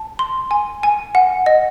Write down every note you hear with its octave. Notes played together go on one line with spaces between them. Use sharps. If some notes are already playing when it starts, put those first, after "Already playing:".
Already playing: A5
C6
G#5
G#5
F#5
D#5